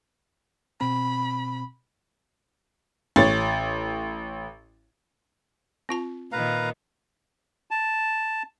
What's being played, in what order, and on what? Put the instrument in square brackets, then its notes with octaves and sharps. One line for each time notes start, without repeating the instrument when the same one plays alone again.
[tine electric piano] B2 C4 [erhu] B5
[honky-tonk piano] A1 C#5 A6
[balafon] C4 F4 A5
[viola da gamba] A#2 D#3 [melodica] B4 F5 A#5
[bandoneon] A5